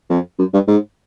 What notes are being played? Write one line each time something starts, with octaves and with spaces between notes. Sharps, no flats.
F2
F#2
G2
G#2